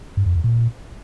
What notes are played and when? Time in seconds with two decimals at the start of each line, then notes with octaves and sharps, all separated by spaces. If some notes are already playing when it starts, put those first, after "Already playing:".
0.17 G2
0.26 F2
0.35 E2
0.44 A#2